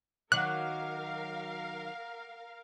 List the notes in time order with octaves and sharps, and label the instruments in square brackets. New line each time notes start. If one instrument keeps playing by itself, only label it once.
[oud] D#3 F#3 [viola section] A#4 F5 [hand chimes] F#5 D6 [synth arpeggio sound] F#6